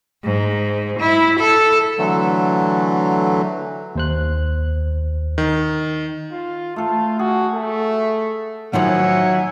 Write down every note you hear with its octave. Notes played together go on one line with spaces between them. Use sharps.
G#2
E4
A4
D3 E3 F#3 A3
D#2 C5 F#6
D#3
F4
A3 F4 A4
F#4 G#4
A3
A2 D#3 F3 F#3 D#4 E5 F#5 G#5